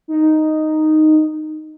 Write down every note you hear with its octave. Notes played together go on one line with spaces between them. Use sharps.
D#4